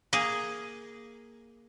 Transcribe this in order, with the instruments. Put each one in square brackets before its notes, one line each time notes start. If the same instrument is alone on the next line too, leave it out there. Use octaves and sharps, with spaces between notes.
[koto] A#3 G#4